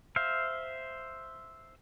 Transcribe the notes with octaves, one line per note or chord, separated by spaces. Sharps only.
C5 E5 F5